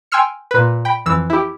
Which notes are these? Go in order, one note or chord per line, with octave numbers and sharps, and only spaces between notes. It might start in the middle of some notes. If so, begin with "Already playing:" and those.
G5 G#5 C6 E6 F6 C#7
A#2 B4
G5 B5
F2 E3 E6
E4 G4